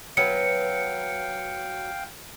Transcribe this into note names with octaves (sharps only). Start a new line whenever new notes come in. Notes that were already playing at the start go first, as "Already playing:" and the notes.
F#3 B3 B4 F5 G5 C#7